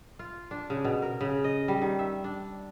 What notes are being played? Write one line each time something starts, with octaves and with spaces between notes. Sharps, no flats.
F4
D4
C#3
B2
A#4
C#3
D#5
G3
D#3
E5
D4